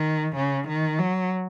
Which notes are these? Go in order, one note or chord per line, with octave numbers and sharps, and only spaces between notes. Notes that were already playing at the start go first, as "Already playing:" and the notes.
Already playing: D#3
C#3
D#3
F#3